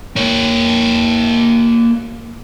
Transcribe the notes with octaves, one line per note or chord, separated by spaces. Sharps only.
A#3 C#5